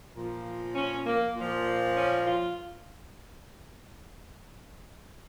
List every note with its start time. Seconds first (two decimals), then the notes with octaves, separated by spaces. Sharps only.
0.15 A#2 F3
0.75 C#4
1.06 A#3
1.36 A#2 F3
1.96 C#4
2.26 F4